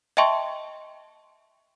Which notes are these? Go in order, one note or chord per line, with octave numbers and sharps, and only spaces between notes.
D#5 E5 G5 A5 C6 C#6